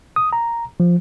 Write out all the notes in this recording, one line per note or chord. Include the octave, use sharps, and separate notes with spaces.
D#6
A#5
F3